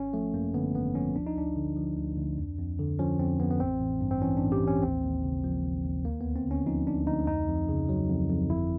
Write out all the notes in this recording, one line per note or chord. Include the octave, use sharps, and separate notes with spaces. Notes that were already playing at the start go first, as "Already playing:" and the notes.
Already playing: G#1 C#4
F3 A3
F#2 A#3
D3 B3
G#1 B3
F3 C#4
D2 D4
D#4
D2 D4
D3
F3
D2
D2
F2
F2
D3
F3 C#4
F2 C4
F2 B3
B3
A1 C4
A1
G2
C4
E3 C#4
D4
A1
G4
A1
C#4
D#2 C4
D#2
C#3
F3 A#3
D#2
D#2
D2 A#3
D2 B3
C4
D3 C#4
F3 D#4
D2 D4
D2 D#4
F2 D#4
F2
C#3
F#3
F2
F2
G1 E4